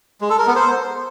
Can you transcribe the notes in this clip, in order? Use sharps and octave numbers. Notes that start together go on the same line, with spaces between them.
G#3
A4
A#4
B3
C5